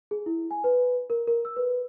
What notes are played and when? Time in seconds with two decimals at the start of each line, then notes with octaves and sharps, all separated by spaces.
0.11 G#4
0.26 E4
0.51 G#5
0.64 B4
1.10 A#4
1.27 A#4
1.45 E6
1.56 B4